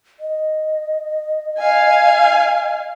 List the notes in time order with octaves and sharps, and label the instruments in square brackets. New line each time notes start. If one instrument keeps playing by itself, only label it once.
[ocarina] D#5
[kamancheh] F5 G#5